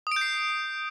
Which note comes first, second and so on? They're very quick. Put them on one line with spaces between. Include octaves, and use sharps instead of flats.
D#6 D7 G6 C7